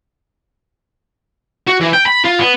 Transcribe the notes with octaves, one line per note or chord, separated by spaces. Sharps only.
F#4
E3
G5
B5
F4
B3